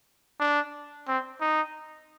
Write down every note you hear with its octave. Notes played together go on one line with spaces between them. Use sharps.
D4
C4
D#4